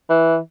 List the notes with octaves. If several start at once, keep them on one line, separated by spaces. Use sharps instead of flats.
E3